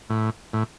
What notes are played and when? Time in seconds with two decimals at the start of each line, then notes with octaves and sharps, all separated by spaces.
0.10 A2
0.53 A2